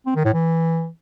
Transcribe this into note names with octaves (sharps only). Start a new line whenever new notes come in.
C4
D#3
A2
E3